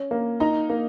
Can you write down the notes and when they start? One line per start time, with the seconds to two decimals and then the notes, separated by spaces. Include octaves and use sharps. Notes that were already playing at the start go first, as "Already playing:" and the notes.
Already playing: C#4
0.11 A#3
0.40 D#4 A#5
0.70 A#3